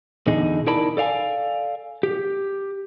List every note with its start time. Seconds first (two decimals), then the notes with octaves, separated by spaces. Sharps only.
0.27 E2 B2 D3 D#4 G#4 D#5
0.67 D#4 E4 A#4 D5 A5 B5
0.97 A4 D5 F5 G#5
2.03 G4